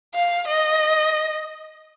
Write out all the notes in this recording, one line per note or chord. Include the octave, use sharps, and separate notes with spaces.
F5
D#5